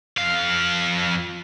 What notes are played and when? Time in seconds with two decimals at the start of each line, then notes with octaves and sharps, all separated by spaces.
0.18 F2 F5